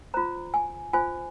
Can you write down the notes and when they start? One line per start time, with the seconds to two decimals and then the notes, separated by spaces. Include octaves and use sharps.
0.14 F4 C5 A#5
0.54 G#5
0.93 F4 C5 G#5